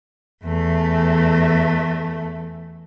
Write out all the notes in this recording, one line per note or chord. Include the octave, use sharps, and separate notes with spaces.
E2 A3